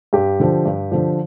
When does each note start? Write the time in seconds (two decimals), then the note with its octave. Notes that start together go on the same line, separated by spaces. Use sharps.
0.13 G2 G4
0.40 D3 F3
0.66 G2
0.92 D3 F3